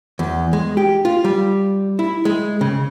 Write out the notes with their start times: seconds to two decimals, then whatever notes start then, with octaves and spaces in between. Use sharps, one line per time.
0.19 E2
0.53 G#3
0.77 G4
1.05 F4
1.24 G3
1.99 E4
2.25 G#3
2.61 C#3